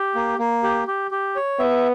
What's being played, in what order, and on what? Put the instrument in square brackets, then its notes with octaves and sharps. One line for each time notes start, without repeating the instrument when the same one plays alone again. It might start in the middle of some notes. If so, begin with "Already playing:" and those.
Already playing: [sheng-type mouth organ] G4
A#3
A#3
G4
G4
G4
C#5
[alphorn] B3 [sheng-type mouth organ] E5